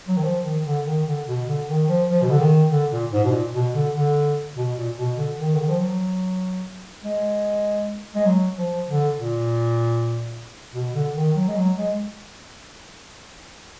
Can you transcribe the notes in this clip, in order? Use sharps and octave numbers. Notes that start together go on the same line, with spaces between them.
F#3
D#3
F3
D#3
D3
D#3
D3
B2
D3
D#3
F3
F3
B2
D3
D#3
D3
A#2
G#2
B2
A#2
B2
D3
D3
B2
A#2
B2
D3
D#3
D3
D#3
F3
F#3
G#3
G#3
F#3
F3
D3
A#2
B2
D3
D#3
F#3
G#3
F#3
G#3